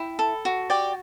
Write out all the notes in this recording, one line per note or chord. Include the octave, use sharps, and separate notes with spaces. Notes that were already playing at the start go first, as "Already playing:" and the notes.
Already playing: E4 G5
A4
F#4
G4 D5 G5